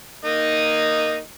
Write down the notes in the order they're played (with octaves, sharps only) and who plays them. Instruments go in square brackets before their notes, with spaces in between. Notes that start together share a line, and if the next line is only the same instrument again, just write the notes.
[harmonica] A#3 D#4 D#5